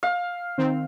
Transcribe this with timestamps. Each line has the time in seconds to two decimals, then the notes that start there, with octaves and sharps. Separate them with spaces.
0.03 F5
0.58 D#3 C4